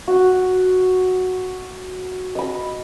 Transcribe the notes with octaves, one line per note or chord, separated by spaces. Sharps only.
F#4
D#5 B5